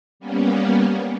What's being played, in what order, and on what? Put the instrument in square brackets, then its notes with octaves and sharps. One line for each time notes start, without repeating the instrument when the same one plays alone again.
[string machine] G3 A#3 B3 C#4